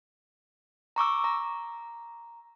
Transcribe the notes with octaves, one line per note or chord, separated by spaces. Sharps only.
A#5 C#6 D6 E6
A#5